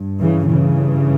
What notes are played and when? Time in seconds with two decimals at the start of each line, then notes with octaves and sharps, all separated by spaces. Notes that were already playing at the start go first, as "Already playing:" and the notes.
Already playing: G2
0.20 C#3 E3
0.48 C#3 E3